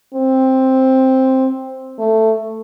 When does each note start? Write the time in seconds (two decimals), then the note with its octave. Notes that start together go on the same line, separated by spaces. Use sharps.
0.14 C4
1.99 A3